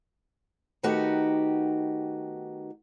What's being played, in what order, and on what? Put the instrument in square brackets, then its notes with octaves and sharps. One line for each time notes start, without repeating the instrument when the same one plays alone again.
[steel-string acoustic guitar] D#3 A3 B3 D#4 F#4 G4